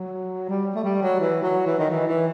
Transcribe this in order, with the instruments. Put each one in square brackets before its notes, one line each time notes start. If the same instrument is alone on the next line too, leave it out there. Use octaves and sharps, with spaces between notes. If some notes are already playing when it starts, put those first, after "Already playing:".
Already playing: [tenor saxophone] F#3
G3
A3
G3
F#3
E3
F#3
E3
D#3
E3
E3